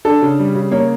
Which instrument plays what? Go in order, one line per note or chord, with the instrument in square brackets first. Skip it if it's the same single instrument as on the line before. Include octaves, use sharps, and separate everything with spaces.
[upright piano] D4 A4
C#3
G3
C#3
A#3 C#5